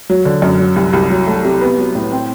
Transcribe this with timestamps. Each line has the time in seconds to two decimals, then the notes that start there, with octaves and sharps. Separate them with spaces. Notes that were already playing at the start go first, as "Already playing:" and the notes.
0.10 F#3
0.25 D3
0.42 F#2
0.59 F#3
0.76 C2
0.93 C2
1.10 F#3
1.27 A3
1.45 C3
1.61 B3
1.78 F#3
1.95 A2
2.12 C4